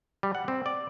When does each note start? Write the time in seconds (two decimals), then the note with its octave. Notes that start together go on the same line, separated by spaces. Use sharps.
0.23 G3
0.35 F#5
0.48 C4
0.66 D5